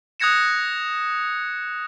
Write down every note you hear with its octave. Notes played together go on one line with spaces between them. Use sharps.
D#6 F#6 G#6 A#6 C#7 E7